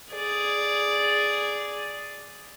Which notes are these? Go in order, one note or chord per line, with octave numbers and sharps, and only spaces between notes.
G#4 D5